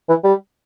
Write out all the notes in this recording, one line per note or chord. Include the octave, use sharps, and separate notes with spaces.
E3
G3